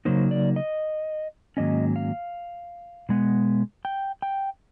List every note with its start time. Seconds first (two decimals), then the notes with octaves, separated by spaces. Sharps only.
0.05 C#3 F#3 A#3 D#4 C5
0.31 D5
0.56 D#5
1.57 G#2 D#3 F#3 A#3 C#4 D#5
1.96 F5
3.09 B2 G#3 B3
3.85 G5
4.22 G5